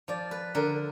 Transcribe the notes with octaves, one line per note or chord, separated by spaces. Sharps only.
F3 D5
B4
D3 A#4